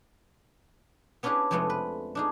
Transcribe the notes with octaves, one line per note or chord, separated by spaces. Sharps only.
B3 C#4 D4 E4 G4 G#4
F2 C3 G#3 A3 B3
B4
D4 D#4 G#4